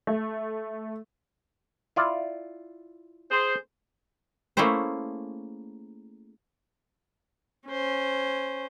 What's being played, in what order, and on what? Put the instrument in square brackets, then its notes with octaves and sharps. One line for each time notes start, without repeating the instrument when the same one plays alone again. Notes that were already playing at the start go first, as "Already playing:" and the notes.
[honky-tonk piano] A3
[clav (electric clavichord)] E4 F4 D5
[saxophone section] G#4 C5
[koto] A3 A#3 C#4 E4 G#4 C5
[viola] C#4 C5